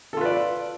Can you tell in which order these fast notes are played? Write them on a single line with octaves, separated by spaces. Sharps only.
A4 F4 B4 D5